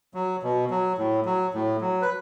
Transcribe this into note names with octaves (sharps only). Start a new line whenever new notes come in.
F#3
B2
F#3
A2
F#3
A2
F#3
B4